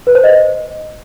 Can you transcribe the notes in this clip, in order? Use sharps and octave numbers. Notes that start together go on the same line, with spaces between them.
B4
C5
D#5